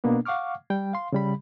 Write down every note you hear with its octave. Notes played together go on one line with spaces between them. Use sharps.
B2 A#3 B3 D4
F5 F#5 C#6 D6 F6
G3 G5
F5 C6
C#3 G3 B5